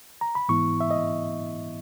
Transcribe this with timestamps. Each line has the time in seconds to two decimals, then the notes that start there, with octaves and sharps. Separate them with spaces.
0.21 A#5
0.35 B5
0.49 G#2 E3 B3 E4 C#6
0.80 E5
0.91 D#5